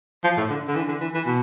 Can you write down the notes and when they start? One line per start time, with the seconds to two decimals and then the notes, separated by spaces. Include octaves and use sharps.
0.24 F3
0.37 A2
0.50 D3
0.68 D3
0.76 E3
0.88 D3
1.01 E3
1.14 E3
1.26 B2